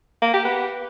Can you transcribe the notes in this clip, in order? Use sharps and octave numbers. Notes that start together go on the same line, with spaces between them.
A#3
G4
B3